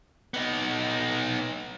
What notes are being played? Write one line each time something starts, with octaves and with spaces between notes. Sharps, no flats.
B3 D#4